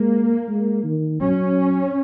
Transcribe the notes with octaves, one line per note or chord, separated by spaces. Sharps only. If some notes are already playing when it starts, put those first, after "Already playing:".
Already playing: G#3 A#3
G#3
D#3
F#3 C#4